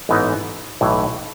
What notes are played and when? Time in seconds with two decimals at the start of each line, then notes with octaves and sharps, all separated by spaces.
0.09 A1 G#2 E3 B3 D#4
0.81 B1 A2 E3